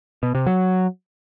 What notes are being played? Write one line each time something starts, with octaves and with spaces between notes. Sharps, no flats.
B2
C3
F#3